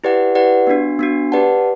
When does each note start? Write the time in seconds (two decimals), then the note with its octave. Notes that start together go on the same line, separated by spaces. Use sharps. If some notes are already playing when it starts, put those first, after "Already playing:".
0.04 E4 G4 B4 D5 F#5
0.35 E4 G4 B4 D5 F#5
0.67 B3 D4 F#4
0.99 B3 D4 F#4
1.32 G4 B4 D5 F#5 A5